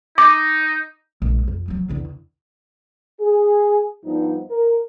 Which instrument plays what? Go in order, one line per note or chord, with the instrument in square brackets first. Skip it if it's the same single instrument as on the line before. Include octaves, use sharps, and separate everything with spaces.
[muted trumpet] D#4 [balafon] D6
[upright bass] A#1 G#3
F2
F3 F#3
E2 D3
[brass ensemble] G#4
G2 F3 B3 D#4
A#4